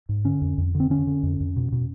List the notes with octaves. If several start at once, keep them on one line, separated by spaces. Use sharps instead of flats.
G#2
D3 C#4
F2
F2
D3
C4
D3 C#4
D3
F2
F2
B2
B2